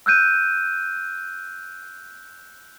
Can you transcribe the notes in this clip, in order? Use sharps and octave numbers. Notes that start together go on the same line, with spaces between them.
E6 F#6 G6 D#7